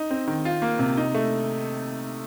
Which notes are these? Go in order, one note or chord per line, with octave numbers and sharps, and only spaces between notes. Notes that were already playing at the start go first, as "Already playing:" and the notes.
Already playing: D#4
C4
D#3
F4
A#3
C3
D#4
A3